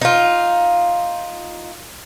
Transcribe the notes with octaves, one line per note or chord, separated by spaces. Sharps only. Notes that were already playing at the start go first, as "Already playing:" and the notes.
D#4 F4